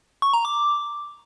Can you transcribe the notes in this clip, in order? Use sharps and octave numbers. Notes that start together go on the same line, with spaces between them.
C#6
A#5
D6